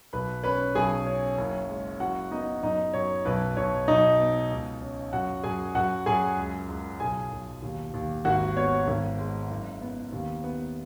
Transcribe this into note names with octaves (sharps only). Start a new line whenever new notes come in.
B1 B4 B5
C#4 B4 B5
B1 G#4 G#5
C#4
F#1
G#3
F#1 F#4 F#5
B3 D#4 D#5
F#2 D#4 D#5
F#2 C#5
B1 B4
B1 C#5
B1 D#4 D#5
B3
C#2
C#4
F#2 F#4 F#5
F#2 G#4 G#5
F#2 F#4 F#5
F#2 G#4 G#5
C#2
C#2
B1 G#4 G#5
B1
D#2
D#2
G#1 F#4 F#5
B3 C#5
G#1
G#3
F#1
B3
D#2
B3